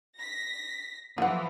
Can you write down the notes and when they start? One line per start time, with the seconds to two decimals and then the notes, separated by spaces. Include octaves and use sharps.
0.18 A#6 B6
1.18 E3 F3 F4 F#5